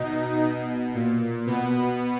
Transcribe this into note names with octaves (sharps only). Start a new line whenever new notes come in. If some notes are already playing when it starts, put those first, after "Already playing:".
Already playing: B2 D#4
B2
A#2
B2 B3